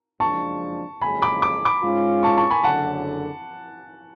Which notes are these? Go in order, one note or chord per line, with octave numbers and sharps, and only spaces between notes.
F#1 F2 F3 G#3 D4 A5 C#6
F#1 F2 C#3 G#3 G#5 B5
B5 D6
D6
B5 D6
G#2 G#3 C#4 F4
A5 C#6
A5 C#6
G#5 B5
F#1 F#2 D3 F#5 A5